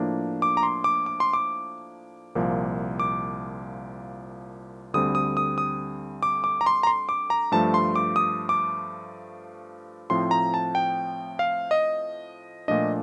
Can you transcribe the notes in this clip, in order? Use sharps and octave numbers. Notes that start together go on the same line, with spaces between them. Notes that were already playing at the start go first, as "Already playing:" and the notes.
Already playing: A2 F3 A#3 D4
D6
A#5
C6
D6
D6
C6
D6
C2 A#2 F3 A#3
D6
D2 D3 G3 C4 D#6
D#6
D#6
D#6
D6
D6
A#5
C6
A#5
C6
D6
A#5
G2 F3 A3 A5
C6
D6
D#6
D6
A2 F3 C4 C6
A#5
A5
G5
F5
D#5
A#2 F3 A3 D4 D#5